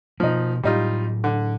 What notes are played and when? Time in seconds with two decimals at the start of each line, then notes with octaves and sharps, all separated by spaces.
0.20 B2 F3 A#3 D#4
0.63 A2 F#3 G3 D#4 F4
1.24 D3